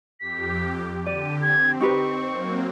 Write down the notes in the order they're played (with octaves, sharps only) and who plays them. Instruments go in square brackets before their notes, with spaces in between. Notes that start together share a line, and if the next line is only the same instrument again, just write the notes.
[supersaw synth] F2 G4 [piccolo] B6
[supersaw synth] D3 G4 [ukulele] D5 [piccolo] D#7
[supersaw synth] C4 [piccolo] G#6
[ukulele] D#4 G4 B4 [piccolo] C#6
[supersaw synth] F#3 A#3 C4